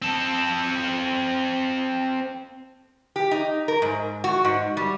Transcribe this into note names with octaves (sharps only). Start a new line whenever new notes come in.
C4 A4
G4
D#4
A#4
G#2
F#4
G#2
G3